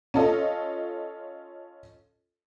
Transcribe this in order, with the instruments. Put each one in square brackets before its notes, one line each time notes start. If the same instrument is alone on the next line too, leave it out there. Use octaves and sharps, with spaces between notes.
[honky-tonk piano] C#4 F4 A4 D#5